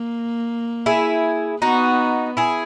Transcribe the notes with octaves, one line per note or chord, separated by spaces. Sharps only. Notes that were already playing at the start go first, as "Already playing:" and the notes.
Already playing: A#3
E4 G#4
B3 D#4 F#4
E4 G#4